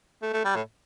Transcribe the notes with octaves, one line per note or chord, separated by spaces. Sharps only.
A3
A3
G3
A2